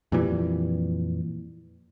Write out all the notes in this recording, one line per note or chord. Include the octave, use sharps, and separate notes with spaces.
F2 A#2 E3 G3